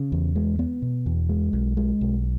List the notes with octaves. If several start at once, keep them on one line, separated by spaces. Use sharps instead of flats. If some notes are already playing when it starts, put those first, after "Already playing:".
Already playing: C#3
E2
G#3
B3
B2
E2
G#3
B1
G#3
B1